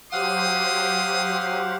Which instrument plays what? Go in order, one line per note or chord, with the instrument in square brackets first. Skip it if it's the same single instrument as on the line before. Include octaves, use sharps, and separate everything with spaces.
[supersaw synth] F#3 G4 C5 [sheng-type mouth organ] F5 F#5 [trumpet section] C6 D#6